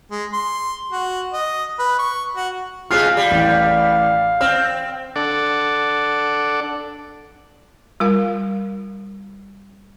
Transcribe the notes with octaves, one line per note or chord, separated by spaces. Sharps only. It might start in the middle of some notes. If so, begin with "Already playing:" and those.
G#3
C6
F#4
D#5
B4
C#6
F#4
C3 G#3 F4 F5 F6 C7
G3
A1 D5
C4 F6
D4 A4 D5 F#5
G3 F4 A#4 F5